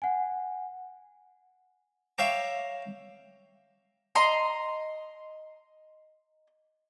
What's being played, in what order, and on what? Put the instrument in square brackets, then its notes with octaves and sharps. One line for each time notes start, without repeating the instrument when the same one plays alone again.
[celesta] F#5 G#5
[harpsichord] C#5 E5 F5 G5 A#5 D6
[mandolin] D#5 A#5 C6